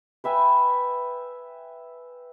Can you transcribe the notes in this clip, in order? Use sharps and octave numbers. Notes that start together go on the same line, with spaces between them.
B4 E5 G5 G#5